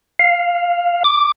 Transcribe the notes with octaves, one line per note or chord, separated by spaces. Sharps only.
F5
D6